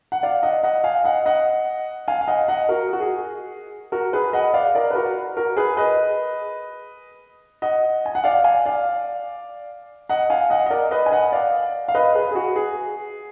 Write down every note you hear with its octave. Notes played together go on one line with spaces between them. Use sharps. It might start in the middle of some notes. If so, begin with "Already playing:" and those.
F#5
D5 F5
D#5 F#5
D#5 F#5
F5 G#5
D#5 F#5
D#5 F#5
F5 G#5
F5
D#5 F#5
D#5 F#5
F#4 A#4
F#4
G#4
F#4 A#4
G#4 B4
D#5 F#5
D5 F5
A#4 D5
B4
F#4 A#4
F#4 A#4
G#4 B4
B4 D#5
D#5 F#5
G#5
F#5
D5 F5
F5 G#5
D5 F5
D#5 F#5
F5 G#5
D#5 F#5
D#5
A#4 D5
B4 D#5
G#5
D#5 F#5
D5 F5
F5
B4 D#5
G#4 B4
G#4
F#4
G#4